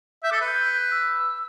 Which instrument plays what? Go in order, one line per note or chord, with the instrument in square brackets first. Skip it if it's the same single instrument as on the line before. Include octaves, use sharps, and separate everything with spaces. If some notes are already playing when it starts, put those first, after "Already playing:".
[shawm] E5 [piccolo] G6
[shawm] A4 [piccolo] D6 E6
[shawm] B4
[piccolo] G6
E6